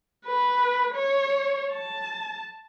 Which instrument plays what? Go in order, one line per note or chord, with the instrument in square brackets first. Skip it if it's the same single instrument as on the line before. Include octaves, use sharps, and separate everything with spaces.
[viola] B4
C#5
A5